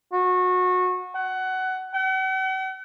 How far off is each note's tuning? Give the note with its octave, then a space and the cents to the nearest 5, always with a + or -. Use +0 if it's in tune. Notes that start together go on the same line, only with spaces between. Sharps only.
F#4 -25
F#5 +20
F#5 +45